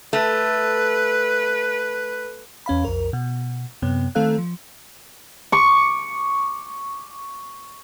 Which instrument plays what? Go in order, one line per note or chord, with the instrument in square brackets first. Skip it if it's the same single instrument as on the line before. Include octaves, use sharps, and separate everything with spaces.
[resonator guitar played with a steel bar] A3 [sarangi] B4
[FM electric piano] E2 C#4 F5 B5
B1 F2 A#4
B2
F#2 C3 B3
D#3 A3 C4 A4 F5 F#6
F3
[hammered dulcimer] C#6 D6